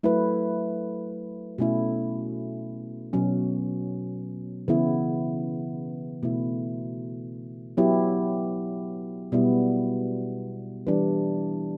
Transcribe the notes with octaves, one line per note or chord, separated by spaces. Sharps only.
F#3 A3 E4 B4
B2 A3 C#4 E4
B2 F#3 C#4
C#3 E3 B3 E4
B2 A3 E4
F#3 B3 E4 G4
B2 G3 B3 E4
E3 G3 D4